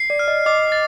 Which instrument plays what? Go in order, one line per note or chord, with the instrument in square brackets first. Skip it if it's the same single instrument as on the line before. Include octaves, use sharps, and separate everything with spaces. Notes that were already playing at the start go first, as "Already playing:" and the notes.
Already playing: [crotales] C7
[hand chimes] D5
[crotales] F6
[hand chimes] D#5
[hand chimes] D#5 [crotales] D6
[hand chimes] D#5
[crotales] A6